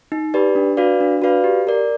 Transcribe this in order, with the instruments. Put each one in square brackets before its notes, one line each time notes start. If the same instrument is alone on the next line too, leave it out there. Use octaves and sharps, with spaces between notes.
[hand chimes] D#4
G4 B4 D5
D4
F#4 B4 D5 F5
D4
F#4 B4 D5 F5
G4
A#4 D5